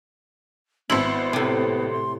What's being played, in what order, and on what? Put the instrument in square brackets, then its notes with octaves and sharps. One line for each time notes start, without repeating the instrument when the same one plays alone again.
[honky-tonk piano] G#1 C5 F#7 [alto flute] B3 [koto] E4
[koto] A2 C3
[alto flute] C6